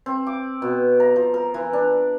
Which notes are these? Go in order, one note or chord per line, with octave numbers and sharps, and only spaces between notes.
C4
D6
B2
A#5
F3
A#4
E3
D4